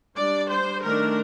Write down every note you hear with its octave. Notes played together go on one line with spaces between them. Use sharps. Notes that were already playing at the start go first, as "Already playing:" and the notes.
G3 D4 D5
C5
D#3 A3 D4 A#4